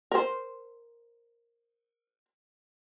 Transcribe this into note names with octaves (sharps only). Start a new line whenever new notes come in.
A#4 C5